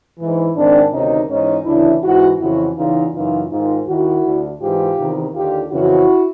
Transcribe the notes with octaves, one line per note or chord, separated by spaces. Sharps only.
G#2 E3
G#2 D#3 C4 D4
D2 C3 D#3 C#4 D#4
G#2 E3 C#4 D#4
D2 C#3 E3 D4 E4
G#2 E3 E4 F#4
F2 C#3 E3 E4 F#4
E2 C#3 E3 D#4 F4
F#2 C#3 E3 D#4 F4
G#2 D#3 D#4 F4
D#2 D#3 E4 F#4
D2 D3
G#2 E3 F4 G4
E2 C3 D#3
D#2 D3 F4 G4
F2 C#3 E3 E4 F#4